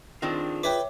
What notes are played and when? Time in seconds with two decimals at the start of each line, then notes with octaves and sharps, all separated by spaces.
0.22 D#3 C4 D4 F4 G#4 A4
0.63 B4 C#5 E5 G5 D6